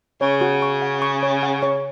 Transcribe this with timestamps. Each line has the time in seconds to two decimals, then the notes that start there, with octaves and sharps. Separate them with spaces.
0.21 C#3 C#5
0.41 F#4
0.62 C#6
0.82 F#5
1.02 C#6
1.23 C#5
1.43 F#5
1.63 C#5